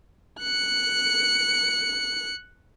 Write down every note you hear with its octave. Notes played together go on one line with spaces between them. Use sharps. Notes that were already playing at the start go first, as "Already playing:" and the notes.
F#6 C#7